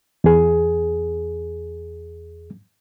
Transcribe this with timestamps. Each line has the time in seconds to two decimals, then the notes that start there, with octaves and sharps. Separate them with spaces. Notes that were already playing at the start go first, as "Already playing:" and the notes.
0.24 E2 G#4